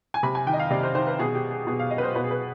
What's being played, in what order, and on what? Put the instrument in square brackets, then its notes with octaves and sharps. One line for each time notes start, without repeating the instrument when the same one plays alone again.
[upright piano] G#5
C3 B5
G#5
D#3 G5
D#5
F5
C3 D5
C5
D#3 C5
B4
B2 G#4
G4
G#4
B2 G#4
F5
D#5
B4
C5
B2 B4
G#4
B4